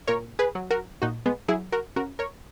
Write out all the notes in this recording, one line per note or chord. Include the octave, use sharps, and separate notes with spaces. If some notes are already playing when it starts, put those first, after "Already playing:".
A#2 A#4 C#5
G#4 B4
F#3
F#4 A#4
A#2 D#4 F#4
G#3 B3
F#3 E4 G#4
F#4 A#4
C#3 F#4 A#4
A#4 C#5